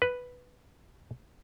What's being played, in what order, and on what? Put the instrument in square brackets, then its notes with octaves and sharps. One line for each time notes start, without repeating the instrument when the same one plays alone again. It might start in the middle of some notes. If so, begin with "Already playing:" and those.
[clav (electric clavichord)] B4